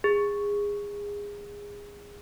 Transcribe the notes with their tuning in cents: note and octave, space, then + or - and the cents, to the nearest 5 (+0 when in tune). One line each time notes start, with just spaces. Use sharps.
G#4 -25